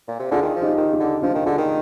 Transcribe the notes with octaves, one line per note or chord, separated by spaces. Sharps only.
A#2
C3
D3 F4 G#4
D#3
F3
D#4 G4
D#3
D#4 G4
D3
F3 D4 F4
D#3
D3 F4 G#4
D#3